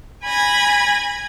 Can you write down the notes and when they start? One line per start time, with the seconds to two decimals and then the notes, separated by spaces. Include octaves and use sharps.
0.24 G#5 B5 G#6 A#6